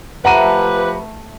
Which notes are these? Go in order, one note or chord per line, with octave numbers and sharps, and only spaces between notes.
F3 A3 G4 B4 E5 F#5 A#5 D#7